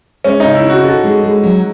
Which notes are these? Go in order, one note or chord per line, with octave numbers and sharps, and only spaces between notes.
G#3 C#4
C#3 D#4
E4
D#4 F#4
F#4 A4
G#3
G#3
F#3